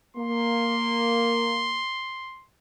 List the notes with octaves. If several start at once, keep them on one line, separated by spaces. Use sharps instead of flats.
A#3 C6